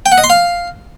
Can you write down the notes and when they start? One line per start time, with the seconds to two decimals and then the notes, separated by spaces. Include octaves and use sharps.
0.06 G5
0.12 F#5
0.18 D#5
0.24 C6
0.30 F5